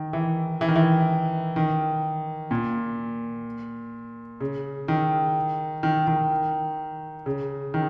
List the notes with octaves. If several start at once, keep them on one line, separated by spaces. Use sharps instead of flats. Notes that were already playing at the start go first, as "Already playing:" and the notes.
Already playing: D#3
E3
E3
D#3
E3
D#3
A#2
C#3
D#3
D#3
D#3
C#3
D#3